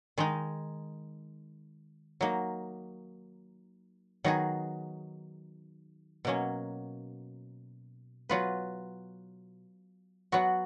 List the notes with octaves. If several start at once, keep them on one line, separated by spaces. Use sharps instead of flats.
D#3 G#3 D#4
F#3 A#3 D#4
D#3 F#3 B3 D#4 G#4
B2 F#3 A#3 C#4
F#3 B3 F4 B4
F#3 B3 F#4